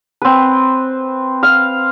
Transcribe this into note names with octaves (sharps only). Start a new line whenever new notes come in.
C4 B4
F5